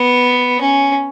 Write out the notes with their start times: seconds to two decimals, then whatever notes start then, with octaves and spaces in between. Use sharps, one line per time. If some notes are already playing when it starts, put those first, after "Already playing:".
Already playing: B3
0.61 C#4